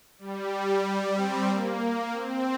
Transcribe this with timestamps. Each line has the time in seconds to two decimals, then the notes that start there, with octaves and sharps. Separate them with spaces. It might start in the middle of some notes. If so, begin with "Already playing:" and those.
0.19 G3
1.16 C4
1.48 A#3
1.80 A#3
2.12 C4